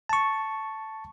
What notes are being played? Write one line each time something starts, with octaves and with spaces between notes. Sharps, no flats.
A5 C#6